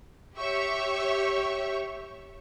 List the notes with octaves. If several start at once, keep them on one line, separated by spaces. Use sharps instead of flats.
G4 C#5 E5 C#6